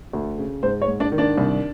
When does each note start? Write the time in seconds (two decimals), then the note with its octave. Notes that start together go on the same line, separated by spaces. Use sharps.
0.13 D2
0.38 C#3
0.63 G#2 C5
0.82 C#5
0.88 G#2
1.00 D4 D5
1.12 D#3
1.18 D4 D5
1.38 C2